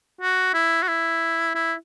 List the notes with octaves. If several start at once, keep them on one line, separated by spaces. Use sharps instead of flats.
F#4
E4
F#4
E4
E4